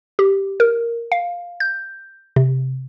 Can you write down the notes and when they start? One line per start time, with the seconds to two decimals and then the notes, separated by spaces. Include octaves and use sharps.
0.19 G4
0.60 A#4
1.12 F5
1.60 G6
2.36 C3